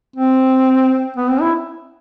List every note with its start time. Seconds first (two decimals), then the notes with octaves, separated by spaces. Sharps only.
0.16 C4
1.17 B3
1.29 C4
1.41 E4